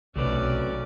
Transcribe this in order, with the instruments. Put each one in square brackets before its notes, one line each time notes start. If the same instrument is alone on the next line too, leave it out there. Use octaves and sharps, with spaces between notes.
[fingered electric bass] B1 C3 [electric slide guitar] F#3 A3 B4 [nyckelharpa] C#4 D5